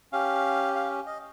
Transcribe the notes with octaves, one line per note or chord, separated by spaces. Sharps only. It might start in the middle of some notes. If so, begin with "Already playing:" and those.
C#4 G4 F5
F5
D#5